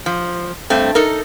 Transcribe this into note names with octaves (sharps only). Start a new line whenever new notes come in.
F3
G2 A3 C4
D#4 A4 A#4